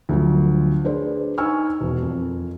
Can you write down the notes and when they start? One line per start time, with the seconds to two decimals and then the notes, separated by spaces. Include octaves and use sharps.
0.09 D2 F3 F#3
0.84 D4 G#4 B4 C5 D5
1.38 D#4 G#5 C#6 E6 F6
1.81 E1
2.02 F2